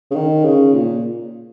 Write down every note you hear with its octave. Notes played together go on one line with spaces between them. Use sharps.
C#3
D#3
C#3
A#2